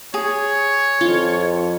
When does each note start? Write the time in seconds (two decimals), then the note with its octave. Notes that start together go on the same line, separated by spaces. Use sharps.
0.14 G#4 C#5
1.01 F2 F4